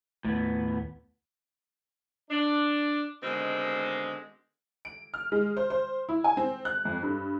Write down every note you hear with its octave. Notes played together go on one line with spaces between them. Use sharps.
D#2 A2 B3 C4
D4
B2 D3 D#3 G#3 C4
D7
F6
G#3
C5
C5
E4
G#5
C4
F#6
F2
G2